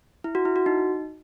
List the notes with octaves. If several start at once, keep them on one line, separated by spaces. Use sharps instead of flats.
E4
F#4
E4
F#4
D#4